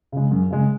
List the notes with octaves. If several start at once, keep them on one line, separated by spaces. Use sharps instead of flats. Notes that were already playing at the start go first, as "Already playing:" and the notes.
C#3 G#3
F#2
C#3 G#3